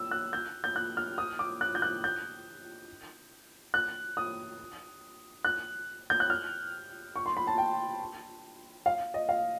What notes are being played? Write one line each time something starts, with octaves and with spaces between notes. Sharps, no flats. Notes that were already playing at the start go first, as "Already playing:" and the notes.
Already playing: E6
F#6
G6
G6
F#6
F6
D#6
D6
F#6
G6
F#6
G6
F#6
D#6
F#6
G6
F#6
F6
C#6
C6
B5
A5
G5
F5
D#5
F5